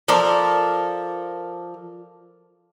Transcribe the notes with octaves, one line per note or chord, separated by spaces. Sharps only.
F3 A4 A#4 D5